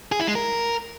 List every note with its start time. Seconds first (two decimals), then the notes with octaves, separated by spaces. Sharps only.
0.12 G#4
0.20 E4
0.27 G#3
0.35 A#4